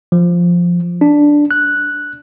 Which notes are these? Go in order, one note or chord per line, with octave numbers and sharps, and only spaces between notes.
F3
D4
F#6